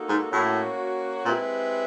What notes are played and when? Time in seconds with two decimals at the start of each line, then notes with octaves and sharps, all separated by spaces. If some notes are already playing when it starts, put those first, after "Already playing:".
Already playing: A#3 D#4 F#4 A4
0.09 G#2
0.32 A2 A#3 C#4 F#4
1.25 A#2 G#3 C4 E4 G4 B4